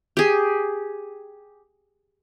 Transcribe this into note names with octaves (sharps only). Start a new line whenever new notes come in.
G4 G#4